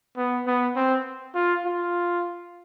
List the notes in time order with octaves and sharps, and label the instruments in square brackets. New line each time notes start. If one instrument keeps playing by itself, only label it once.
[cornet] B3
B3
C4
F4
F4